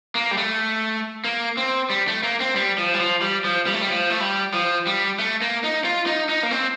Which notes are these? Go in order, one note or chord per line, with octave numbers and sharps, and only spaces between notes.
A#3
G3
A3
A#3
C4
G3
A3
A#3
C4
G3
F3
G3
F3
G3
F3
G3
A3
G3
F3
A3
G3
F3
G3
A3
A#3
D#4
F4
D#4
D#4
A#3
C4